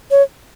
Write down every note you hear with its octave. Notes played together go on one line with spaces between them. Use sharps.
C#5